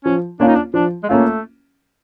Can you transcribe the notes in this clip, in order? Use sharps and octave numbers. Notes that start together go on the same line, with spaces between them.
F3 C#4
A#3 C#4 D4 F4
D#4
D4
F3 D4
G#3
A3 A#3 C#4 F4